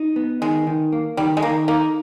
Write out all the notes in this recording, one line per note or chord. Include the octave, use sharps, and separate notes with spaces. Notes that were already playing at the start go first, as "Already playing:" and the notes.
Already playing: D#4
B3
D#3 G#3
D#3
A#3
D#3 G3
G#3
D#3 A#3
A#3 D#4